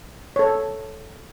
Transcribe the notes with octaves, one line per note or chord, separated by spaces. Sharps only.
A4 C#5